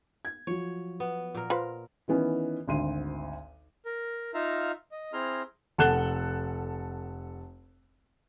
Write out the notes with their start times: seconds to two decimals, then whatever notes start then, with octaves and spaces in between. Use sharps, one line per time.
0.25 G#6
0.47 F3 F#3 C#5
1.00 B3
1.35 A#2 A#4
1.50 F4 B4 C5
2.08 D#3 E3 B3 C#4
2.68 G#1 D2 C6 D#7
3.86 A#4
4.34 D#4 F4 E5 F5 A#5
4.92 D#5
5.13 C4 E4 G#4 A#5 C6 F6
5.78 F1 A4 F#5 F#6 E7 G7